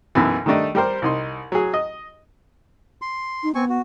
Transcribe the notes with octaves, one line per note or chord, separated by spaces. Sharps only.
B1 F#2 B2 E3
D#3 G3 A3 D4 D#4
G3 G4 A#4 C5
C2 D#4 C6
F#3 G#4
D#5
C6
D#4
B3 C4 G#5 C#6
F#4